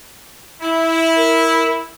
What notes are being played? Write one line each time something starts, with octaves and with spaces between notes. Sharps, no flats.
E4
A#4